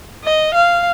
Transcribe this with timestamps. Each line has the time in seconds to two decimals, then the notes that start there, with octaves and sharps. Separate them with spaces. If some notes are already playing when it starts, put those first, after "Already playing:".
0.24 D#5
0.54 F5